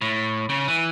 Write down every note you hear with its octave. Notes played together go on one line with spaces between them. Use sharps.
A2
C#3
E3